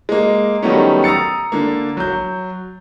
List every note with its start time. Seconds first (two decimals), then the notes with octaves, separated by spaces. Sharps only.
0.09 G#3 A#3
0.62 D#3 F#3 G3 A3 B3 C#4
1.04 A#5 D#6 E6 A6 C#7
1.52 D3 A#3
1.97 F#3 G6